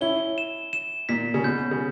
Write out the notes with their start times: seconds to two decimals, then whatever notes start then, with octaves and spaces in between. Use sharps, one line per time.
0.01 C#4 E4 G7
0.38 E7
0.73 E7
1.09 A#2 B6
1.34 C#3
1.44 B2 G6
1.71 C#3